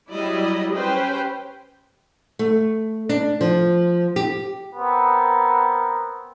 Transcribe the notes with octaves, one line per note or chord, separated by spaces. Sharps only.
F#3 G3 E4 D5 D#5
C#4 G4 B4 C5 G5
A3
D4
F3
G4
B3 C4 A#4